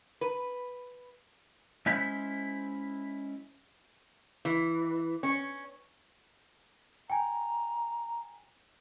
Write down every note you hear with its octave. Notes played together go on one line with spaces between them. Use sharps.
B4
G#3 C#4 E4 C5 E5
E3
C#4
G5 G#5 A#5